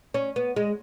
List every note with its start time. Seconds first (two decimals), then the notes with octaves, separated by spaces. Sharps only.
0.14 C#4
0.36 B3
0.56 G#3